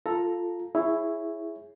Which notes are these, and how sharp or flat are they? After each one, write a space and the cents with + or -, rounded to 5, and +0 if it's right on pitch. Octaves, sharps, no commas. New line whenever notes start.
F4 +0 A4 +0 A#5 +0
E4 +5 G#4 +0 C#5 +0